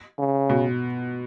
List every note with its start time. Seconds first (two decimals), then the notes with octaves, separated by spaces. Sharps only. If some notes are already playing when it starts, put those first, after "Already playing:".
0.19 C#3
0.50 B2